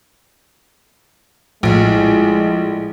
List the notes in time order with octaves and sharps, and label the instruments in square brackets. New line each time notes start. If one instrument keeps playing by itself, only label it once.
[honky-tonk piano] A#1 [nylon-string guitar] A2 F4 [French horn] G#3